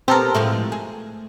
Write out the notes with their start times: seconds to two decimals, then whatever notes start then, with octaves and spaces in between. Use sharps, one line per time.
0.08 B3 C4 G4 A4 A#4
0.35 A2 F3 G#3 A3
0.72 G#4